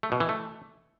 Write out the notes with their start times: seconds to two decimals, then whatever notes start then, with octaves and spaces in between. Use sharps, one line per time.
0.03 A3
0.12 B2
0.20 E3
0.29 A3